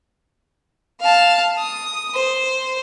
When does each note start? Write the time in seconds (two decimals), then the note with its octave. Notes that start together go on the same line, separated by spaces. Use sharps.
1.00 F5 A5
1.58 D#6
2.14 C5